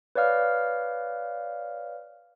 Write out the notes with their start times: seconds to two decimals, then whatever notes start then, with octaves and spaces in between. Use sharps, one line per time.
0.15 B4 C#5 D5 F5 F6